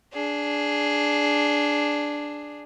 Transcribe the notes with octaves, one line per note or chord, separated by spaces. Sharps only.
D4 G#4